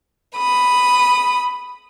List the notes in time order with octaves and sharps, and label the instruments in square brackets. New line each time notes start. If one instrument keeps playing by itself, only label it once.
[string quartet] B5 D#6